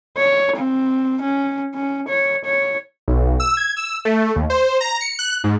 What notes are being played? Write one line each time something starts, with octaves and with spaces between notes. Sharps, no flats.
C#5
C4
C#4
C#4
C#5
C#5
B1
E6
G#6
E6
A3
D#2
C5
A#5
C#7
F#6
G#2